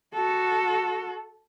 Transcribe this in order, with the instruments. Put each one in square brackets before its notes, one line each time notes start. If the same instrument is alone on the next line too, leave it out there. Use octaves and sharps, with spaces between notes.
[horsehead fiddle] F#4 A4